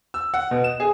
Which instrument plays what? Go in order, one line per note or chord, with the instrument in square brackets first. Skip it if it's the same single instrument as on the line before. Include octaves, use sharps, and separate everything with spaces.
[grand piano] E6
F#5
B2
E7
G#4